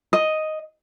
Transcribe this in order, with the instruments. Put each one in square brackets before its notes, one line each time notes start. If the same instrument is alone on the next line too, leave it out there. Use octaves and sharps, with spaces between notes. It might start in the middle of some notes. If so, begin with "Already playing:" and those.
[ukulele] D#5